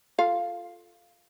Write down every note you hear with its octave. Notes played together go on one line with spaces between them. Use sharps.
F4 A4 F5